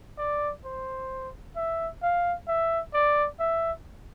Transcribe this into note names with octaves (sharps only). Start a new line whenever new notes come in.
D5
C5
E5
F5
E5
D5
E5